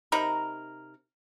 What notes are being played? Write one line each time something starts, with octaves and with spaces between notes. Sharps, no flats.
C3 D#4 A#4 B5